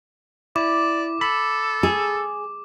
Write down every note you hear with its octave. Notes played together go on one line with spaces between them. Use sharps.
E4 D5 D6
A4 B5
G#4